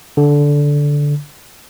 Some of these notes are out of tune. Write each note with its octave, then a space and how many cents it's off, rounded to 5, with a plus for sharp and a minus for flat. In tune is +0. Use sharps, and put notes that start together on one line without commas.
D3 -10